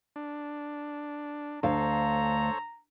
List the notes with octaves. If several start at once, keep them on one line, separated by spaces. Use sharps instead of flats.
D4
D2 A4 C5 C#5 F5 A#5